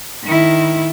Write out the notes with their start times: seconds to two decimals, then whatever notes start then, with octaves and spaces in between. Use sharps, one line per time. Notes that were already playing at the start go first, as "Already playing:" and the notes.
0.24 D#3 E4